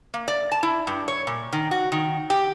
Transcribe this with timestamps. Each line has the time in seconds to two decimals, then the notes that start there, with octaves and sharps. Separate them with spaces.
0.14 A#3
0.28 D5
0.52 A5
0.63 E4
0.87 G2
1.08 C#5
1.27 A#2
1.53 D#3
1.71 F#4
1.92 D#3
2.30 G4